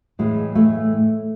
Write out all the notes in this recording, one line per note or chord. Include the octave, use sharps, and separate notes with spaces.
A2 E3 G#3
A3